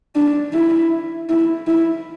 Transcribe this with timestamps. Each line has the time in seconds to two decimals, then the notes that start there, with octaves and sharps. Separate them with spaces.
0.16 D4
0.53 E4
1.29 E4
1.67 E4